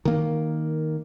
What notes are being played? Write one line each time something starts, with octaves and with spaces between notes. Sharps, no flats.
D#3 A#3